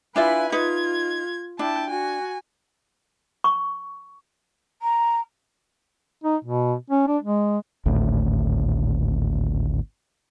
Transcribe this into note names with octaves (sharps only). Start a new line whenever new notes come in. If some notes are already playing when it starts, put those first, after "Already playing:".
D4 E4 F4 B4 E5 G#5
D#4 F4 B4 G#6
D4 E4 G5 A5
F#4 G#5
C#6
A#5
D#4
B2
C#4
D4
G#3
G#1 D2 A2